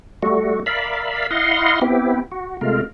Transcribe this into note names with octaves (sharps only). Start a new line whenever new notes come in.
G3 A3 F#4
A#4 D5 E5 F5 B5
E4 D#5 F5 F#5 C6
B3 C4 E4 G4
F#4
C3 G#3 A3 F4 A#4